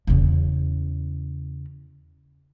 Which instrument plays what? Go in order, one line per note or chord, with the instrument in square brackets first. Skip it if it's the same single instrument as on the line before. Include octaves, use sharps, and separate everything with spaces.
[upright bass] E2 C#3